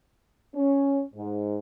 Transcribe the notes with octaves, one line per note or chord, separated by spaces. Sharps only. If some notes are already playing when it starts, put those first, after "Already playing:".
C#4
G#2